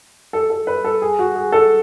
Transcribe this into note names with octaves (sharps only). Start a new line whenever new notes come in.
A4
A4
B4
A4
G#4
F#4
G#4
A4